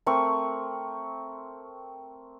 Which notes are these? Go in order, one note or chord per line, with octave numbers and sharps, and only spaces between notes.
A3 C4 A#4 C#6